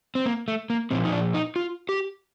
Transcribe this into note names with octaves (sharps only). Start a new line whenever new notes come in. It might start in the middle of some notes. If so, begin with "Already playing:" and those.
C4
A#3
A3
A#3
A#2 F3 C4
D#4
D4
D#4
F4
G4